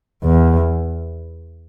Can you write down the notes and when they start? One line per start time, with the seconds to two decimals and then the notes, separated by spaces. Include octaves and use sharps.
0.24 E2